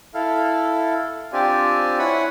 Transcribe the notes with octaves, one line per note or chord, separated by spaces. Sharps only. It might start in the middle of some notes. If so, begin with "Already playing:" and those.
E4 A4 F5
C4 D4 F4 G4 D5 G#5
E4 C#5 F#5 G#5 B5